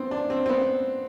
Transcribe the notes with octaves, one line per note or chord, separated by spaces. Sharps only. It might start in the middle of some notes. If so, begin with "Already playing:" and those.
Already playing: B3 C4
D4
C4
C4
B3